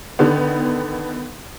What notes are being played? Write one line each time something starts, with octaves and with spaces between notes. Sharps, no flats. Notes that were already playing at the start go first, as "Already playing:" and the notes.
D3 D#3 B3